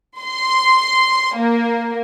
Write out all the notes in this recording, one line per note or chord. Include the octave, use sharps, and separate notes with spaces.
C6
A#3